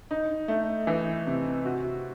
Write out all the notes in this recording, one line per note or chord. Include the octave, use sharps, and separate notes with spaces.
D#4
A3
E3
C3
F#4